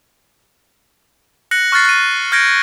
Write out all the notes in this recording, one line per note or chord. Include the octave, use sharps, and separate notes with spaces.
F#6 A#6 C#7 F#7
C#6 F6 F#6 A6 C7
F#6 D#7
F6 G6 G#6 A#6 C#7 D7